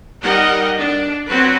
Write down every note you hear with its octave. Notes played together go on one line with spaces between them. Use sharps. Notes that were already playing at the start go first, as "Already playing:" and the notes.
G3 D#4 A#4 D#5 F#5
D4
F#3 C4 F#4 B4